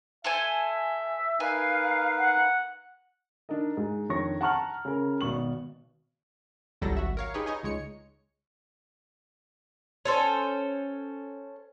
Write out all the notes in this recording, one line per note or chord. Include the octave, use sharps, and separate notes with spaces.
A4 C5 E5 G#5
D#4 A#4 B4 F5 G#5
F#5
D4 D#4 A#4 D#5
G#2
F2 D#3 D4 C#5 C#6 A#6
F#5 A5 A#5 C#6 F6 F#7
C#3 C#4 A#4
G#1 B2 C#6 F#7
G#1 C#2 F#3 G3 A4 A#6
G#1 F#4 E5
A#4 C#5 F5
D#4 G4 G#4 B4 C#5
D#4 C#5 D#5 G#5
C#2 G#3 C#5 C#7
C#4 A4 C5